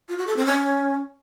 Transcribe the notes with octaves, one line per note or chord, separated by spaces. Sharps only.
F4
F#4
A4
C4
C#4